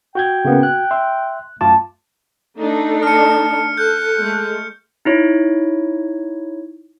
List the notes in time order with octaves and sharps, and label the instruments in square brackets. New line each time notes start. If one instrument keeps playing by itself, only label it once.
[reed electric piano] F#4 G6 G#6 [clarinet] G5
[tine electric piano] C#3 A#3 B3
F#6
[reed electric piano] E5 C6
[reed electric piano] F#2 F4 D6 [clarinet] A3 [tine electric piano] A5
[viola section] A3 D4 D#4
[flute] A5 [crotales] F6 C#7
[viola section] A4 [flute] F#6 [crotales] G6
[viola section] G#3 A3
[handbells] D#4 E4 C#5